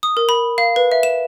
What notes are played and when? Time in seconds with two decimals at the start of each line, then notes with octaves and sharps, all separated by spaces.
0.03 D#6
0.17 A#4
0.29 B5
0.58 F5
0.76 B4
0.92 E5
1.03 E7